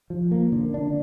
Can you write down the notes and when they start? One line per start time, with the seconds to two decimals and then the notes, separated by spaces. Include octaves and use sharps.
0.10 F3
0.31 A#3
0.52 D3
0.74 D4